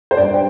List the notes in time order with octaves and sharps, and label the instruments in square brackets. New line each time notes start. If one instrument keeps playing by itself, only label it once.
[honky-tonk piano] C5
G2 G3 D5
G5